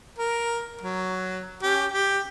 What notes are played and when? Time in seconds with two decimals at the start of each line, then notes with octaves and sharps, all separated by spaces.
0.19 A#4
0.81 F#3
1.62 C#4 G4
1.92 G4